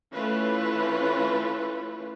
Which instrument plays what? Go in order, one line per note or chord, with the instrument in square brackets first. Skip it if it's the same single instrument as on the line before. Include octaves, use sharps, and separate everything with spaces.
[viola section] E3 A3 C#4 F4 B4